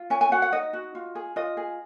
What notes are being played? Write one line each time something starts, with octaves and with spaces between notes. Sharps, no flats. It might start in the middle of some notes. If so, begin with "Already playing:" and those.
Already playing: F4
C#4 G#5
G#5
F#4 F#5
F#5
D#4 D#5
F#4
F4
G#4
F4 D#5
G#4